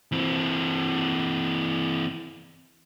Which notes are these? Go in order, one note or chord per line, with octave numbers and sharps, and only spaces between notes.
E3 C4